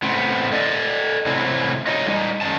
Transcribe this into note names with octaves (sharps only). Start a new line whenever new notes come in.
A2 B3 C4
A4 D5 D#5
A2 C3 E3 F#3 C4 E4
D#4 F#4 C#5 D#5
G3 D#4
F#2 D#3 A5